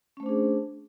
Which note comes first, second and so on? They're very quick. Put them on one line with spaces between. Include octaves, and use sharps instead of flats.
C#4 A3 C5 D4 G#4